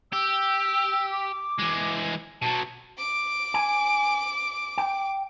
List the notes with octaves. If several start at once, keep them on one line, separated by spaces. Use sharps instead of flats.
G4 E6
D6
E3 G#3
B2 F#3 A5
D6 D7
G#5
G5